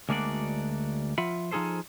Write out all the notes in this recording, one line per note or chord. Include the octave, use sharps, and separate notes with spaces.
D2 G#3 A#3 D4 F#4 D5
F3 F4 E5 F#5 B5
F3 D#4 F4 G#4 A4 C5